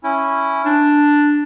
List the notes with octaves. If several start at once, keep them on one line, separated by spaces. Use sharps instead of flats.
C#4 E4
D4 A5